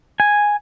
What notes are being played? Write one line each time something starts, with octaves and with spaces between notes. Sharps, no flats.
G#5